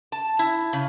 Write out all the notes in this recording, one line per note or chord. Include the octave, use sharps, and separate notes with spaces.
A5
E4
C#3